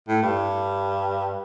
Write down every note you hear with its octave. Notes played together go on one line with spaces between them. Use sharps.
A2
G2